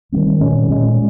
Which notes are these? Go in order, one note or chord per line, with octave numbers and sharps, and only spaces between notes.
D#3 G3 C4
A#2 G#3 C#4
A#2 G#3 C#4